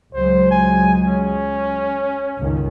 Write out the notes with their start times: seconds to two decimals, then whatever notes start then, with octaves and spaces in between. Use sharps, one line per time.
0.14 C#2 F#3 G#3 C5
0.51 G#5
1.06 C#4
2.36 G1 C#2 D#3